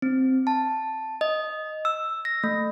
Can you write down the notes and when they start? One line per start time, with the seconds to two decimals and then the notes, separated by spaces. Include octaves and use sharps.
0.02 C4
0.47 A5
1.21 D#5
1.85 E6
2.25 A#6
2.44 A3